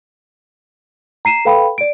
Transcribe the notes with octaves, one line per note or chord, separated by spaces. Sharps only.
A#5 C7 D#7 E7
A4 B4 F5 G5 B5
D5 D7